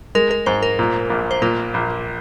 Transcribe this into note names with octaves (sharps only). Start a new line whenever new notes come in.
G#3 A#4
A#4
G#2 C5
A#4
A#2
A#1
C5
A#2 A#4
A#1